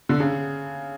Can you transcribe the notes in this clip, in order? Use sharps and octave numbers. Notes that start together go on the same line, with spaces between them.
D3
C#3